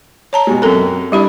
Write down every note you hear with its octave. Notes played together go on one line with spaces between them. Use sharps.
C#5 A5 A#5
B2 G3 G#3
F#2 C4 A4 A#4 A#5
G3 D4 E4 G4 B5